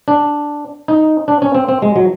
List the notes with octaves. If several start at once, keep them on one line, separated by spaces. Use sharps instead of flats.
D4
D#4
D4
C#4
C4
C4
G#3
F#3